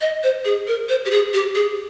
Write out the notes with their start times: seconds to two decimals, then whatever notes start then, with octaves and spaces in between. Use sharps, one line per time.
0.01 D#5
0.23 C5
0.45 G#4
0.68 A#4
0.89 C5
1.05 G4
1.11 G#4
1.34 G4
1.55 G#4